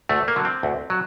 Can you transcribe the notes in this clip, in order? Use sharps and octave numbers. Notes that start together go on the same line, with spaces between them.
D2 A3
A#3
D3 F#3
C4
D2
F#3